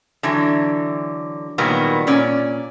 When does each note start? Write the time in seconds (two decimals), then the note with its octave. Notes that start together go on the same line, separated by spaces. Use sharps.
0.23 D3 E3 F#3
1.58 A#2 D#3 F#3 G3 A#3 B3
2.07 A#2 C#4 D5